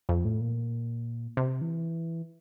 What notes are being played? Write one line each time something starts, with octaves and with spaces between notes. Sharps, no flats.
F2
A2
A#2
C3
E3